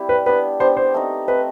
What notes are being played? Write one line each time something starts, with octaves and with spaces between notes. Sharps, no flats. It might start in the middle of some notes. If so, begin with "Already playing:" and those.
Already playing: G3 C4 E4 G4
B4
B3 D4 G4 B4
B3 D4 G4 C5
C5
A3 C4 D#4
A3 C4 D#4 B4